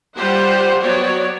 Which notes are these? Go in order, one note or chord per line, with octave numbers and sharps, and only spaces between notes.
G3 F4 G4 C5 F#5
F#3 B3 F#4 C#5 D5